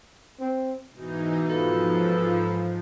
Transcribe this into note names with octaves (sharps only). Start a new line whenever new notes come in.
C4
G#2 B2 E3 D#4
G#2 F3 F4 A4 B4